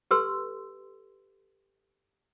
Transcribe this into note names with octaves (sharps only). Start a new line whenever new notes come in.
G4 A4 B4 C6 E6